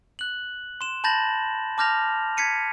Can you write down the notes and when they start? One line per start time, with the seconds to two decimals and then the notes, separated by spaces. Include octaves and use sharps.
0.19 F#6 F#7
0.81 C6 E7
1.04 A5 B5 G6 A6 A#6 F#7
1.78 A5 D6 F6 G6 A#6 F7
2.37 G#6 B6 C#7 D#7